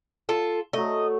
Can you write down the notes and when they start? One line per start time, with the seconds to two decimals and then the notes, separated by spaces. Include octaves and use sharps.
0.29 F4 A4
0.73 F#3 A3 D#5